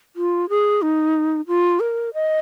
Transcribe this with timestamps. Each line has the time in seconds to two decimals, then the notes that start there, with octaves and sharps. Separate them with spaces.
0.16 F4
0.49 G#4
0.82 D#4
1.48 F4
1.80 A#4
2.14 D#5